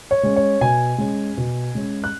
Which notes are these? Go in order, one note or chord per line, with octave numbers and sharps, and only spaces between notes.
C#5
G#3 C#4
C#5
B2 G#5
G#3 C#4
B2
G#3 C#4
F#6